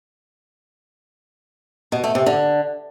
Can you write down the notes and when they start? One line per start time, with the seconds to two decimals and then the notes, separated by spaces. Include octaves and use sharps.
1.92 B2
2.04 A3
2.15 C3
2.26 D3